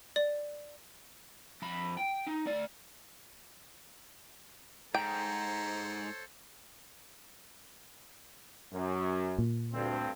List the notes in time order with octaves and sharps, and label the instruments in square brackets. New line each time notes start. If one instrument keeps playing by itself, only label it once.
[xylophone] D5
[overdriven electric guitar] F2 B5
G5
D#4
A3 D5
[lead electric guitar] G#2 [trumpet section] A4 C5 C#5 [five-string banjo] G5 [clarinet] A#5
[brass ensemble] F#2
[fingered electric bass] A#2
[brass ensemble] D2 G2 C4